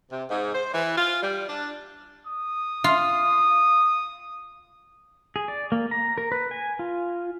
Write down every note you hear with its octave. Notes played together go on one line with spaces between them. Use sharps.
C3
G#2
C5
E3
F4
G3
D4
D#6
F4
G#4
D5
A#3
A#5
A#4
B4
G#5
F4